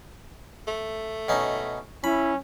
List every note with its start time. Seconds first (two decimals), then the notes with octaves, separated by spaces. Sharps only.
0.67 A3
1.29 B2 C#4 D#4
2.04 C#4 E4 B5